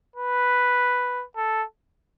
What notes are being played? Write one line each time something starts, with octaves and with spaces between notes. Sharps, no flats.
B4
A4